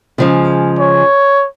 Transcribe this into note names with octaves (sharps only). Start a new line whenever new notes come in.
C#3 F3 G#3
C#5